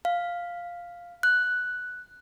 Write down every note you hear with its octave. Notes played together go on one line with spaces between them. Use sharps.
F5
F#6